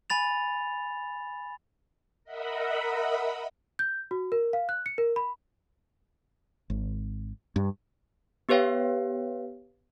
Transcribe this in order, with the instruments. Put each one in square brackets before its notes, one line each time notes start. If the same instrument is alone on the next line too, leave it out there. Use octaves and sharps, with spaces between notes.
[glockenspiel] G#5 B5 A6 F7
[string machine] A#4 D#5 E5 F#5 B5
[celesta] G6
F#4
A#4
F5
F#6
C#7
A#4
B5
[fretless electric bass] G#1
G2
[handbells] B3 G4 B4 C#5 F5 G5